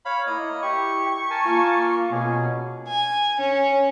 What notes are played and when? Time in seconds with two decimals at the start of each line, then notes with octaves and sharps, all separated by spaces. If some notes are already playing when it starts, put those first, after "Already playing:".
0.05 C#5 F5 B5
0.27 A#3 E4 D#5
0.63 G4 C#6
1.30 A#4 G#5 A5
1.45 A#3 F4
2.12 B2 C#4 G#4
2.88 G#5
3.39 C#4